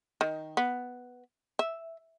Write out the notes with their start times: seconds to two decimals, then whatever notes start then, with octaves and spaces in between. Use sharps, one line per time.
0.21 D#3
0.57 B3
1.59 E5